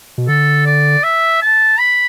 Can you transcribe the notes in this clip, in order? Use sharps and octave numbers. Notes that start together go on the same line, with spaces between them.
B2
D3 A4
D5
E5
A5
B5